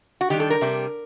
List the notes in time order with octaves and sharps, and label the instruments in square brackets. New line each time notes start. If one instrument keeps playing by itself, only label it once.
[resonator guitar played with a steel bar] F#4
D#3 G3 D4 G4
A4
A#4
C3 G3 D4